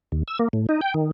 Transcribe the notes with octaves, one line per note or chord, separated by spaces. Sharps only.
D#2
E6
A#3
A2
D#4
G5
D#3